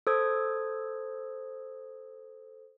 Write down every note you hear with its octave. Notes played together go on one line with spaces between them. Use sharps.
A4 C5 D#6 G#6